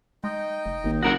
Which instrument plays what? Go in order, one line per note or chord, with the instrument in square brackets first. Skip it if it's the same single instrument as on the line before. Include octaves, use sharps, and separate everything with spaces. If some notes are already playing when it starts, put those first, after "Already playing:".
[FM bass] G#3 [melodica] D#4 D#5 G5
[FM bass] F1
[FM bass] G#1 [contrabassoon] D#2
[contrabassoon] F#1 [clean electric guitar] F#4 A#4 F#5 [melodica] D#5 E6